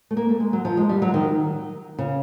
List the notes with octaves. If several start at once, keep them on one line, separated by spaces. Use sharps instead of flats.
A3
A#3
A3
G#3
F#3
F3
G#3
G3
F#3
D#3
C#3